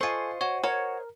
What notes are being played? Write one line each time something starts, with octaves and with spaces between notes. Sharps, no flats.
F4 A4 C5 D#5 G#5 C#6
F#4 C#5
F#4 A#4 C#5